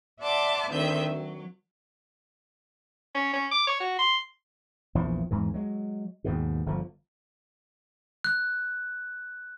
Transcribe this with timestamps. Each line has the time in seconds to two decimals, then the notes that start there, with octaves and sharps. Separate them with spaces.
0.21 D5 E5 F#5 A5 C6 D6
0.70 D2 D#3 C4 D#5 E5 G6
1.08 F#3
3.15 C#4
3.34 C#4
3.51 D6
3.67 C#5
3.80 F#4
3.99 C6
4.95 A#1 E2 E3 F3
5.31 E2 G#2 E3
5.54 F#3 G#3
6.24 D#2 G#2 B2
6.66 G1 D3 F3
8.24 F#6